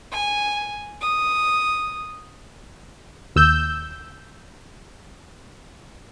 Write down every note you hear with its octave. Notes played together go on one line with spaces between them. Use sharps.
G#5
D#6
D#2 E6 G6